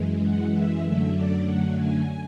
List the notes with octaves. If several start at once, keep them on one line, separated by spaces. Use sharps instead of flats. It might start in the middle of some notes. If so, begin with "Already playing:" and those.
Already playing: F#2 E3 G#3
F#5
E5
F#2 D3 F#3 A3 E5
D5
F#5
G#5